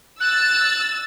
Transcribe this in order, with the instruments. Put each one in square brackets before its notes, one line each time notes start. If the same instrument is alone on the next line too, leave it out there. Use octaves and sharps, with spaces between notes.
[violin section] E6 A6 [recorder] F#6